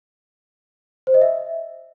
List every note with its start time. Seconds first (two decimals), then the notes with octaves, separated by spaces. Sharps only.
1.07 C5
1.14 D#5
1.22 E5